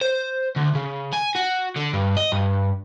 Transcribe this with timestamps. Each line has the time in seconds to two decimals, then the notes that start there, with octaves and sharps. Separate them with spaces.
0.01 C5
0.56 D2
0.75 C#3
1.13 G#5
1.36 F#4
1.76 D3
1.93 G2
2.17 D#5
2.32 G2